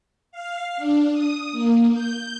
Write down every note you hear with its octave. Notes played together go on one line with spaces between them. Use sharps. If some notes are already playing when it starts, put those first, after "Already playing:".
F5
D4
D#6
A#3
G6